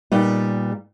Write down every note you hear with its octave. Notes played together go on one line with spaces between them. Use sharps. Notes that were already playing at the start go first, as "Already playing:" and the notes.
A#2 G3 B3 D#4 G4